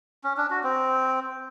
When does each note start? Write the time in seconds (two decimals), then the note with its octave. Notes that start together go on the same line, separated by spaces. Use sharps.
0.24 C#4
0.37 D4
0.50 F#4
0.63 C4